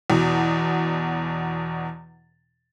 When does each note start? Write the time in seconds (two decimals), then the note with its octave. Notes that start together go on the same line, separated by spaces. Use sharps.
0.10 E2 B2